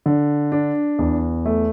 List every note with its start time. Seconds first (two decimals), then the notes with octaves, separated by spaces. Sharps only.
0.06 D3
0.52 D4
0.99 E2
1.45 A3